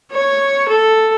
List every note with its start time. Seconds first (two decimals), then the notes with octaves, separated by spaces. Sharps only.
0.12 C#5
0.68 A4